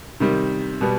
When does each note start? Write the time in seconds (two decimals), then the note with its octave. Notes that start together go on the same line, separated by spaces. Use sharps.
0.20 C3 D#3 G3
0.81 B2 G3 B3